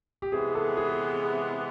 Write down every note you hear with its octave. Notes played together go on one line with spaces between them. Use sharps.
G4
C3 E3 G#3 B3 G#4
A4
G#4